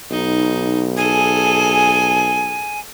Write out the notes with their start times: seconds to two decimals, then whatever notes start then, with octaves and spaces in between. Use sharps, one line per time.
0.11 B1 D#4
0.97 G#4 A4 G#5